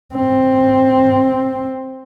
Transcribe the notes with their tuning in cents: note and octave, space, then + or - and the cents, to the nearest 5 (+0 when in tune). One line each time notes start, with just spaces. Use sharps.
C4 +5